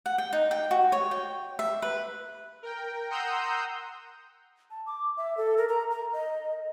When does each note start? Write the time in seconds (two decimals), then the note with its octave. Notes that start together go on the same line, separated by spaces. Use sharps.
0.06 F#5
0.18 G5
0.33 D#4
0.51 G5
0.71 F#4
0.92 C#5
1.11 G5
1.59 E5
1.82 B4
2.63 A#4 G5
3.10 F#5 A#5 C6 D#6 E6 G6
4.71 A5
4.86 D6
5.17 E5
5.37 A4
5.58 A#4
5.69 A#5
5.91 A#5
6.13 D#5